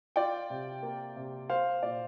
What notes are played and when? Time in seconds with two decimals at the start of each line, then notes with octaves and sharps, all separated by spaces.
0.16 F4 D5 G5
0.50 C3
0.83 A#3
1.16 C3
1.50 A#3 C5 F5
1.83 A#2 D5